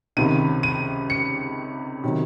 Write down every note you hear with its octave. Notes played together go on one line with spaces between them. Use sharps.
C#2 C3 D#3 D#7
D#7
C#7
C3 D#3 F#3